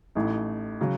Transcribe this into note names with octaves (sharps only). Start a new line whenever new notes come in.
A1 A2 A3 D#4
C#3 F#3